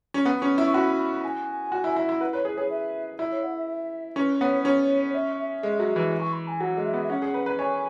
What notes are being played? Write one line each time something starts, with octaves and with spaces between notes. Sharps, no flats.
C#4
B3
C#4
E4
C#6
F#4 B5
B5
G#5
F#4
E4
E4
E4
B4 F#5
B4 C#5
G#4 B4
G#4 C#5
E5
E4
C#5
F#5
E5
E5
C#4 B4
B3 C#5
C#4 C#5
C#5
E5
E5
G#3
F#3
E3
C#6
B5
G#5
F#3 F#5
G#3
E5
B3
E5
C#4 F#5
G#4
B4
B4
C#5 G#5